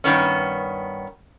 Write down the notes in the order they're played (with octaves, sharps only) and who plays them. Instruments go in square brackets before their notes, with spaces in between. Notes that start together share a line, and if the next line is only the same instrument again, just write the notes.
[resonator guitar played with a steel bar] G2 D#3 B3 C#4